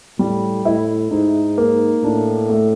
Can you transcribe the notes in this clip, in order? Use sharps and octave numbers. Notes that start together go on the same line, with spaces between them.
A2 G3
A2 E4
G#2 D#4
A#3
A2 D4
A3